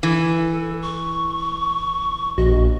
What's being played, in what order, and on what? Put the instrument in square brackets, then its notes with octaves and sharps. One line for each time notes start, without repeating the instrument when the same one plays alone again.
[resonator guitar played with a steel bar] E3 [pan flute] A4
[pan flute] C#6
[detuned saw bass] A#1 [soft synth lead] F#4 [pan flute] D#5